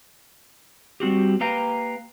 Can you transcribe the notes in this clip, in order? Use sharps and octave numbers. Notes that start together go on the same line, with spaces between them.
G3 C4 F#4 G4
A#3 G4 B4 F5 G5 A#5